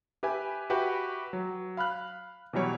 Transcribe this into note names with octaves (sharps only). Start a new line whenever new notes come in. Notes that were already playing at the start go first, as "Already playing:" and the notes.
G4 B4 E5 G#5
F#4 G4 B4 E5 G5
F#3
F5 B5 F6 F#6
B2 E3 F#3 G3 C#5